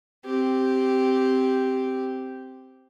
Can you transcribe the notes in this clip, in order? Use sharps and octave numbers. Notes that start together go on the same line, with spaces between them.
C4 G4